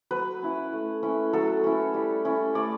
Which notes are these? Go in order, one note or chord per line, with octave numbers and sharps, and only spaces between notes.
F#3 B4
C#4 E4
A3
C#4 E4
F#3 A4
C#4 E4
G3
C#4 E4
A3 D5